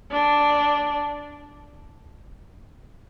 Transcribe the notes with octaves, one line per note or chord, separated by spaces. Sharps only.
D4